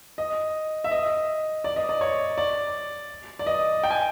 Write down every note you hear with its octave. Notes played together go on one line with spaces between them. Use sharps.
D#5
E5
D#5
D5
D#5
D5
C#5
D5
D5
D#5
G5
G#5